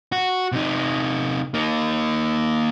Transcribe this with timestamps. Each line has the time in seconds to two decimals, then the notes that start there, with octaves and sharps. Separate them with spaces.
0.12 F#4
0.52 C3 D#4
1.54 A#3 D#4